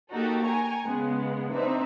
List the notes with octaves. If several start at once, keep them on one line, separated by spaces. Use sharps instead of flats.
A#3 D#4 F#4 G4 A4
G5 G#5 A#5 C#6
C#3 G#3 B3
C4 D4 D#4 B4 E5